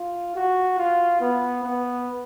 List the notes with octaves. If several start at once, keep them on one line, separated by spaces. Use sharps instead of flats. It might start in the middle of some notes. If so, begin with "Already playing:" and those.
Already playing: F4
F#4
F4
B3
B3